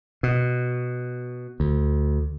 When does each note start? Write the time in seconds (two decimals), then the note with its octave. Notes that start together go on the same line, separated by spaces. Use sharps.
0.23 B2
1.60 D2